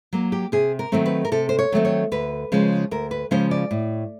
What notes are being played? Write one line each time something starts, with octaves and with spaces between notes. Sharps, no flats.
F#3 A#3
G4
C3 G#4
A#4
D#3 F#3 A3 C4
B4
A#4
C3 A4
C5
C#5
D#3 F#3 A3 C4
C#5
D2 B4
C#3 F3 G#3 C#4
D2 A#4
B4
C#3 F3 G#3 C#4 C5
D5
A2